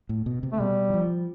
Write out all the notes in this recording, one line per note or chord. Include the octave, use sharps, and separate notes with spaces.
A2
B2
C3
A3
B2 G3
E3
F3